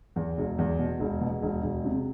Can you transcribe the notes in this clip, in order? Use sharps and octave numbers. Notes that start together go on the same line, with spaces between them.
E2
E1
E2
B2
E1
B2
E1
E1
C3